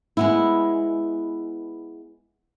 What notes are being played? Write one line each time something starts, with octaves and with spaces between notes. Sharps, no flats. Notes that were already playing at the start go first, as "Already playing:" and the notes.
G#3 B3 E4